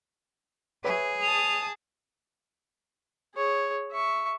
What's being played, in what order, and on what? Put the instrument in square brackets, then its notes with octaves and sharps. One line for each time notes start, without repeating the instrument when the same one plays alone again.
[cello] G#4 [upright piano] B4 C#5 E5
[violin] A5 D#6 [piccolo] F7
[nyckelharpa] G#4 C#5
E5 C#6